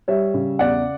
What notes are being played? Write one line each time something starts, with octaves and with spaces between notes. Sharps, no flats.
G3 C#5 E5
C#3
E2 D5 F#5